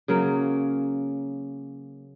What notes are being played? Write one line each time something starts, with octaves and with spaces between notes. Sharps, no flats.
C#3 F#3 A#3